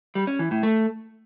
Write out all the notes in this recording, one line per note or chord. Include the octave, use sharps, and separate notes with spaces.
G3
C#4
E3
A2
A3